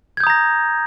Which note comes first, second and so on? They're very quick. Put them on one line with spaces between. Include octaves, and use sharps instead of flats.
G#6 G6 D#6 A#5 A#6